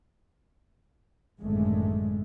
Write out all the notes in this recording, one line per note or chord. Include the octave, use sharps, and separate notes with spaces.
G#1 F#2 A2 D3 G#3 A3